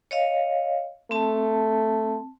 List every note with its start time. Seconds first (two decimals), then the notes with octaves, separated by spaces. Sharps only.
0.11 C#5 D#5 F5
1.11 A3 C4 A5